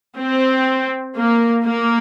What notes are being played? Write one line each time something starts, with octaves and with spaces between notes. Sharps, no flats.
C4
A#3
A#3